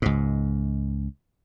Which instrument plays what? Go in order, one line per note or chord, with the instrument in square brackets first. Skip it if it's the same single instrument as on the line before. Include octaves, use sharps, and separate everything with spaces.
[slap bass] C#2 G#2